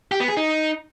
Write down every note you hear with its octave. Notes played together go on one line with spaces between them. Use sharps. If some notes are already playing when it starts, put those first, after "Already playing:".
G4
B3
G#4
D#4